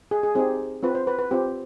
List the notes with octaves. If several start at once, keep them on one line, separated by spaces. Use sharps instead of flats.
G#4
G#4
C4 D#4 G4 G#4
C4 F4 B4
C5
B4
B4
C4 F4 G4